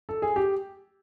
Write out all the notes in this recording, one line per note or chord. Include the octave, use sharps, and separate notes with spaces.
A4
G#4
G4